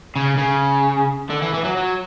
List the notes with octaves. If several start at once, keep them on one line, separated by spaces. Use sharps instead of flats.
C#3
C#3
D3
E3
E3
F#3
F#3